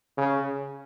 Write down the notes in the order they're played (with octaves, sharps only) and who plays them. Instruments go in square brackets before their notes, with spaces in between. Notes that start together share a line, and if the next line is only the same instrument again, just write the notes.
[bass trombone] C#3